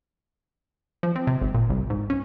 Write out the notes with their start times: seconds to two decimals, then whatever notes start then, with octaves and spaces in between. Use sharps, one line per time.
1.03 F3
1.16 C4
1.27 C3
1.41 G#1
1.54 A#2
1.70 C2
1.90 G#2
2.10 C#4